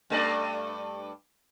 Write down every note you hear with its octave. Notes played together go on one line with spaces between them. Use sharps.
G2 A3 D5